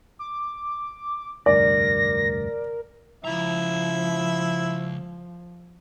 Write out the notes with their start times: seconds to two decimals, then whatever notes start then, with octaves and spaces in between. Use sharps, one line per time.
0.19 D6
1.46 F1 D2 G2 A#4 D5 A#6
3.25 C#2 F3 E4 E5 A#5